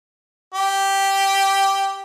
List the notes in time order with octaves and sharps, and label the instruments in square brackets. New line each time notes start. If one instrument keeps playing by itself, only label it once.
[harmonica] G4